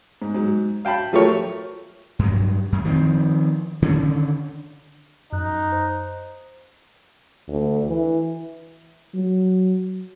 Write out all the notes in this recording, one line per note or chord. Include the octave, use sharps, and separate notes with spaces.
G#2
G#2 F#3
F5 G5 A5 B5
F3 F#3 A3 G4 A#4 C#5
G2 F#3
F#2
D#3 F3 A#3 C4
D3 D#3 C#4
F#2 D#4 F#6
C5
D2
E3
F#3